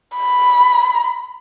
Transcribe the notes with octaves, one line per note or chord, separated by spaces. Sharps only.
B5